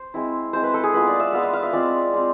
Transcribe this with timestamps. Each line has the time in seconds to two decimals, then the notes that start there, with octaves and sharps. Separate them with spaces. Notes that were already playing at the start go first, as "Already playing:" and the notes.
Already playing: C5
0.14 G#3 C4 E4
0.53 G#3 C4 E4 C5
0.63 B4
0.74 A4
0.84 G#4
0.94 G#3 B3 F4 B4
1.07 D5
1.20 E5
1.33 G#3 B3 F4 F5
1.43 E5
1.53 F5
1.63 E5
1.73 G#3 C4 F4 D5
2.13 G#3 C4 F4